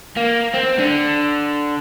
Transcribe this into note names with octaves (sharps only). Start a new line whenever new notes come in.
A#3
C4
D3